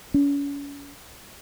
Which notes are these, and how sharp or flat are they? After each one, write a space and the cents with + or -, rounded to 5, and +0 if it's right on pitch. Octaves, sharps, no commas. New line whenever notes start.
C#4 +40